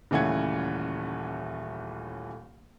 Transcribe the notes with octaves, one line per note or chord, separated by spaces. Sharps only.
D#1 C#3 E3 A3 F#5 G#6